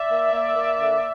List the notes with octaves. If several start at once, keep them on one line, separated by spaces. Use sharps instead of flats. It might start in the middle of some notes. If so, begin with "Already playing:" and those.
Already playing: D5 E5
A#3
A#3
A#3
D3